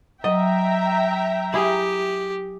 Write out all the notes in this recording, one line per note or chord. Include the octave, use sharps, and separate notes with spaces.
F#3 D#5 E5 G5 A#5
E4 G4 G#4